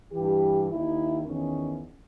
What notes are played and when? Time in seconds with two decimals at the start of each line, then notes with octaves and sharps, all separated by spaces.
0.13 G2 E3 G4
0.69 D#2 E4
0.74 D#3
1.26 E2 D#3 C#4